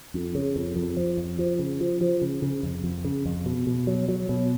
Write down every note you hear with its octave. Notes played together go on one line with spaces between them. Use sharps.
F2
C#3
F2
F2
F3
F2
F3
C#3
F3
F3
C#3
C#3
F2
F2
C#3
F2
B2
B2
F#3
F#3
B2